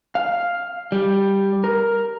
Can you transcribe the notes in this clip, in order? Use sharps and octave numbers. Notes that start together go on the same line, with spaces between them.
F5
G3
A#4